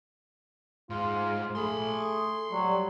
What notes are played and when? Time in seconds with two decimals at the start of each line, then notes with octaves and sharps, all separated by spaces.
0.90 G#2 F4
1.55 A3 G#4 B5 C6
2.52 F#3 G3